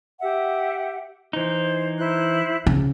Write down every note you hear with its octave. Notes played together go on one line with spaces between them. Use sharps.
G4 E5 F#5
E3 D#4 C5
E4 C5 F#6
C#3